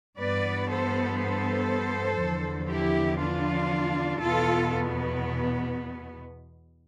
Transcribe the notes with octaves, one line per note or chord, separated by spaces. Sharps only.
G2 E3 B3 B4 D5
A4 C5
A4 C5
E2 D3 F3
E4 G4
D4 F4
E2 B2 B3 F4 A4